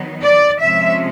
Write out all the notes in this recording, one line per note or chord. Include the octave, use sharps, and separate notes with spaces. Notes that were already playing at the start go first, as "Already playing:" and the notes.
Already playing: D#3 F#3 B3 D#4
D5
C3 F3 G#3 C#4 E5